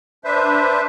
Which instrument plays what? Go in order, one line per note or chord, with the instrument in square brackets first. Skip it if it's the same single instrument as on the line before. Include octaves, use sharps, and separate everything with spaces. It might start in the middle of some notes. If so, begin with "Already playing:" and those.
[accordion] D4 B4 C5 E5